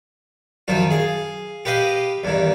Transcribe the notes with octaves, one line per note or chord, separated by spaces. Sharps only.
F#2 D#3 F3 D#4
G#4 F5
G4 B4 D#5 F5
E2 G2 D#3